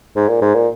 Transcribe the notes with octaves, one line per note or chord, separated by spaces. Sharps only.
G#2
A#2
G#2
A#2